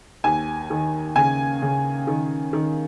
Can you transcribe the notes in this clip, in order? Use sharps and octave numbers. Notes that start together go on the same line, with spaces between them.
D#2 G#5
D#3
C#3 G#5
C#3
D#3
D#3